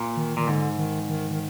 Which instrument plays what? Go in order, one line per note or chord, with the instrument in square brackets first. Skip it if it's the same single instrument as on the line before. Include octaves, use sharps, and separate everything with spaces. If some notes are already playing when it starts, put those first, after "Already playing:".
Already playing: [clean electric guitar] A#2
[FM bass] D#3
[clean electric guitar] A#2 [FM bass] D#3
[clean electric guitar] G#2 [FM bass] D3
[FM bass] D#3
D#3
D#3